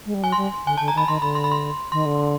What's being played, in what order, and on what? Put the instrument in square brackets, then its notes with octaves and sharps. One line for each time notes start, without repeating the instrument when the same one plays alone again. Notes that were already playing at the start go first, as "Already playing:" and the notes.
[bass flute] G#3
G3
[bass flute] F#3 [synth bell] G#5
[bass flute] G3 [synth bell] C6
[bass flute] D3 [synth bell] G#5
[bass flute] D3 [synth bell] A5
[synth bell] A#5
[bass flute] D#3 [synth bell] B5
[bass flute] D#3 [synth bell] C6
[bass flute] D3 [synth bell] B5
[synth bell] C6
B5
C6
[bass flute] D#3 [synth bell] C6
[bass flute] D3